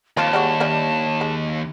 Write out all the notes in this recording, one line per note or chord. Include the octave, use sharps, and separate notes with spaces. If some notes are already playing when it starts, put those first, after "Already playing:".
D#2 F3 C4 F4 A5
G3 G#3 F#4
G3 D4 E4
G#3